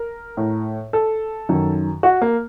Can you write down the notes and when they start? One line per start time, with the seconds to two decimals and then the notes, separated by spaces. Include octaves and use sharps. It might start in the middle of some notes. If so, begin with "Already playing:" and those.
Already playing: A#4
0.37 A2
0.93 A4
1.49 F#2 D#3
2.03 F#4
2.22 A#3